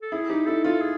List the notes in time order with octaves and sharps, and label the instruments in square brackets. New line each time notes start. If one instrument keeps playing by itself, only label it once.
[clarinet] A4
[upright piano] E4 [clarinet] G#4
[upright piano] D#4 [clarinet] G4
[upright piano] E4 [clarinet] A4
[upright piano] F4 [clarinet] A4
[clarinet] G#4